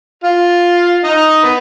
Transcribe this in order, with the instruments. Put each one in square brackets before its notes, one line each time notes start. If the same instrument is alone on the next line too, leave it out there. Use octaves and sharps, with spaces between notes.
[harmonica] F4 F5
D#4 D#5
B3 B4